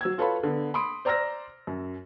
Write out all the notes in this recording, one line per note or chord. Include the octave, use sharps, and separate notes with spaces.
F#3 E6 G#6
F4 A4 B4 C#5 F5 B5
D3 B3
B5 C6 D#6 D7
C5 D5 A#5 E6 F6 A#6
F#2